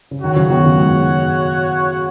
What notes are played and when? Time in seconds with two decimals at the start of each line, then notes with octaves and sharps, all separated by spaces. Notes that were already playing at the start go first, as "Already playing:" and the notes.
0.11 C#3
0.22 D#3 F#4 C#5 F#5
0.36 C#3 F#3
0.50 B2 D#3
0.65 C#3 F#3
0.73 F#2
0.79 G#2